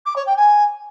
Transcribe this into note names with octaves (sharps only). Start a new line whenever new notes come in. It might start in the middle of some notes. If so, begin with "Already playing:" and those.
D6
C#5
G5
G#5